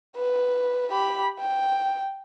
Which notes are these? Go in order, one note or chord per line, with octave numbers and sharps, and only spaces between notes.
B4
G4 B5
G5